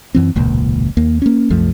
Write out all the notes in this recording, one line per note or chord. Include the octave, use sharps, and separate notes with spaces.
F#2 E3 C4
E1 C#2 A#2
D#2 A#3
A#3 C#4
C2 F#2 F3 A3